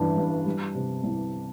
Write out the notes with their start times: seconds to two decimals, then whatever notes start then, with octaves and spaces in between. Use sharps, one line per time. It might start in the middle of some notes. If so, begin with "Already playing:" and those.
Already playing: G1 E3 G3 D4
0.17 G2
0.46 G3
0.75 C3
1.03 C2